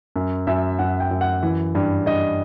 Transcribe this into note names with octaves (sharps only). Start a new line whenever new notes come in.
F#2
F#2 E5
F#2 F#5
G5
F#2
F#5
E3
G2
G2 D#5